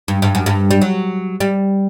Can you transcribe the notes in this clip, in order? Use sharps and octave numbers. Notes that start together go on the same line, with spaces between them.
G2
G2
F#2
G2
G3
F#3
G3